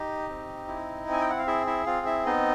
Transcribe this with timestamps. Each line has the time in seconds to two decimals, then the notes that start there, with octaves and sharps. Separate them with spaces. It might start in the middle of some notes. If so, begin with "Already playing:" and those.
Already playing: D#4 G4 D#5
0.29 C4
0.68 E4
1.08 C4 G#5
1.21 G5
1.30 F#5
1.39 F5
1.47 E4 G#4 E5
1.67 E4 E5
1.86 C4 F4 F5
2.06 E4 E5
2.26 B3 D#4 D#5